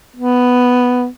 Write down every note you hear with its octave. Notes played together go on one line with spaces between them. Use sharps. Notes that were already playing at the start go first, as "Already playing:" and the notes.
B3